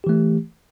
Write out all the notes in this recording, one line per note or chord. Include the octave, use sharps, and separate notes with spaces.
E3 A3 G4